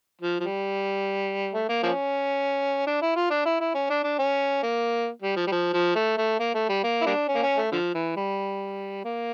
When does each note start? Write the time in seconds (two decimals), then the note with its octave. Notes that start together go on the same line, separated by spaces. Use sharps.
0.21 F3
0.40 F3
0.43 G3
1.54 A3
1.69 A#3
1.83 F3 A#3 C#4
2.87 D4
3.02 E4
3.16 F4
3.30 D4
3.45 E4
3.60 E4
3.74 C#4
3.90 D4
4.04 D4
4.19 C#4
4.63 A#3
5.22 G3
5.36 F3
5.47 G3
5.52 F3
5.73 F3
5.96 A3
6.17 A3
6.40 A#3
6.54 A3
6.69 G3
6.83 A#3
7.01 E4
7.06 G3 A#3 D4
7.28 C#4
7.35 A#3
7.43 C#4
7.57 A3
7.72 D3 F3
7.94 E3
8.16 G3
9.04 A#3